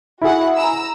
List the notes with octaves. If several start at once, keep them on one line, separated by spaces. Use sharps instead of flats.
E4 F#4 G#4 F#5
A#5 E6